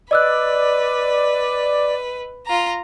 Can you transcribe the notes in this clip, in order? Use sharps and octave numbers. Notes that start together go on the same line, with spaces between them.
B4 D5 D#5 E6 F#6
F4 A#5